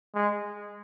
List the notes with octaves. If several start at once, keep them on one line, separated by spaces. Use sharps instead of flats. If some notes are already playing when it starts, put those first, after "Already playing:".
G#3